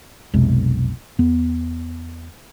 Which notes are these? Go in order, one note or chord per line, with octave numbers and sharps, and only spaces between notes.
B1 F2 C3 G#3
E2 B3